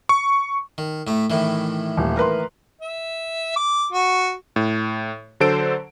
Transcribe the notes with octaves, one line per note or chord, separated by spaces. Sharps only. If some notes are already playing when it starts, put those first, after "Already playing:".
C#6
D#3
A2 A3
A2 D#3 E3
D#1
A#4 B4 C6
E5
D6
F#4
A2
D3 F#3 A4 C5 D7